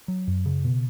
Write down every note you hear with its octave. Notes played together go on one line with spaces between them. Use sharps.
F#3
F#2
C#3
B2